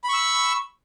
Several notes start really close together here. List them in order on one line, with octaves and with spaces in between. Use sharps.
B5 C#6 E6